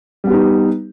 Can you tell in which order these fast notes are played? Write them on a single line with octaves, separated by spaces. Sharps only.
G3 B3 G4 D#4